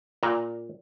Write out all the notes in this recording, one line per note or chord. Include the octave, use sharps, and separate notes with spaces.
A#2 A#5